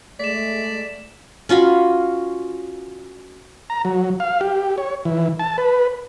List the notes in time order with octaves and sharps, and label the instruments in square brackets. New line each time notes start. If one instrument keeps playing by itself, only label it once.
[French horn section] G#3 A3 [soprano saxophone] D5 [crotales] B6 E7
[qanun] C#4 F4 F#4 B5
[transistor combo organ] A#5
F#3
F5
G4
C#5
E3
A5
B4